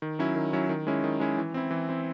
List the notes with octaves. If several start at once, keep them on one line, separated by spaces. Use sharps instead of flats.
D#3
F#3 C#4 E4
D#3
F#3 C#4 E4
D#3
G#3 C#4 E4
D#3
G#3 C#4 E4
E3
C4 E4
E3
C4 E4